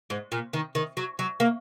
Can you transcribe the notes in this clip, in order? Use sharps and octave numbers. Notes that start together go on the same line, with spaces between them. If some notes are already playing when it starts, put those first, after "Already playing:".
G#2
A#2
D#3
D#3
F#3
F#3
A#3